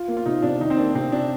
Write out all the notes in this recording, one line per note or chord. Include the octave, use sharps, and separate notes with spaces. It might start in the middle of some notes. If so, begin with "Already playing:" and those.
Already playing: F4
A#3
F4
C3 D#4
C3 D4
D#3 D#4
C4
A#3 D4
C3 C4
C3 D4